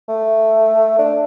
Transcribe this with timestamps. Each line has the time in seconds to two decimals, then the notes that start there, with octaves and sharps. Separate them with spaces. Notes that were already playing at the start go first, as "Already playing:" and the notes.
0.09 A3
0.98 D4